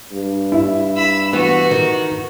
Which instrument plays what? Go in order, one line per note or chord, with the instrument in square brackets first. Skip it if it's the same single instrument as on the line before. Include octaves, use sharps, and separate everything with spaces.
[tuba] G2
[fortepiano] E4
[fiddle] B5 E6
[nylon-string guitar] E3 B3 [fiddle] F#4
[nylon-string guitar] D#3